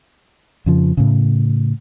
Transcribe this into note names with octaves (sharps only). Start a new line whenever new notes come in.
F2 C#3 F3
A2 C#3